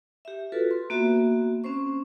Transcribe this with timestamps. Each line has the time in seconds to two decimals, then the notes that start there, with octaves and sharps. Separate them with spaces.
0.25 G4 E5
0.52 F4 F#4 A4 B4
0.71 C6
0.90 A#3 B3 F#4 E5
1.64 C4 C#4 C5 C#6